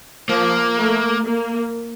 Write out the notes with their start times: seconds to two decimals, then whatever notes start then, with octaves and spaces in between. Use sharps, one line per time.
0.29 F3 A#3
0.78 A3
1.27 A#3